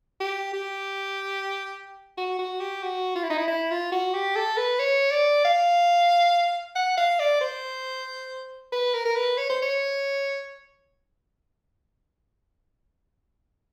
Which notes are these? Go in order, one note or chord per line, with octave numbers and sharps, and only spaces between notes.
G4
G4
F#4
F#4
G4
F#4
F4
E4
D#4
E4
E4
F4
F#4
G4
A4
B4
C#5
D5
F5
F#5
F5
D5
C5
B4
A#4
A#4
B4
C#5
C5
C#5